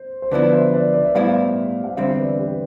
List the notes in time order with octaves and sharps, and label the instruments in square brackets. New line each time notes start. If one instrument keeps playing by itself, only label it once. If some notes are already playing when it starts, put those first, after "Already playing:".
Already playing: [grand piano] C5
C5
[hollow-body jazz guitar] D3 F3 B3 E4 [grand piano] B4 D5
[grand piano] C5 E5
B4 D5
B4 D5
E5
[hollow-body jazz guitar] A2 G3 B3 E4 [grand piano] D5 F5
[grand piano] F5
[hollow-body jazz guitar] E2 D3 G3 C4 [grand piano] C5 E5
[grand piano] B4 D5
G4 B4